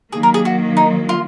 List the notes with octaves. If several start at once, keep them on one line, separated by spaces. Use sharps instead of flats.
D#3 F#3 A#3 G#4
A#4
G#4
F#4
D#4
F4